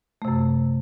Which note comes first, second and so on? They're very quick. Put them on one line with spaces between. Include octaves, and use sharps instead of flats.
A3 C3 F#2